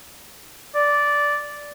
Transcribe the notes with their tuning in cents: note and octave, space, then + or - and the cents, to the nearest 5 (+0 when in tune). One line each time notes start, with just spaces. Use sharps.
D5 -10